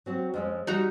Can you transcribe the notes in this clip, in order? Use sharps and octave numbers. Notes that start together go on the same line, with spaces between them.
F#3 C4 F#4
F2 G#3 C#4
G3 D#4 F#4 A#5